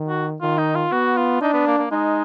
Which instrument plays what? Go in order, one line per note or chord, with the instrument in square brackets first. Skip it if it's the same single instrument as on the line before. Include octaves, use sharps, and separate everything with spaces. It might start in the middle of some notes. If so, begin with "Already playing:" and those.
Already playing: [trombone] D#3
[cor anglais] F#4
[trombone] D#3 [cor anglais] F4
[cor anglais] D#4
F4
[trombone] B3 [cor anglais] F#4
[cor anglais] F4
[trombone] D4 [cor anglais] D#4
[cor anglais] B3
A#3
A#3
[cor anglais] G#3 [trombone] D#4